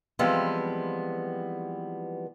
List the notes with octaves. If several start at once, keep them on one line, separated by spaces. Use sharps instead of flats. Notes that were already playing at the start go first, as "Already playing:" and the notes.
E3 F3 G3 G#3 B3 C4